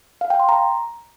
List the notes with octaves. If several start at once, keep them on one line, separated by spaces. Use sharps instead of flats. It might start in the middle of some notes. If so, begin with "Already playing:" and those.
F5
G5
C6
A#5